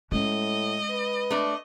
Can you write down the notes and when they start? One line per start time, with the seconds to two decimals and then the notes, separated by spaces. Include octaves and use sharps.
0.12 A2 G#3 C#4 D#5
0.90 B4
1.30 A3 D4